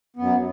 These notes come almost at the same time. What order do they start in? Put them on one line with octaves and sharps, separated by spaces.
B3 F#2 F#3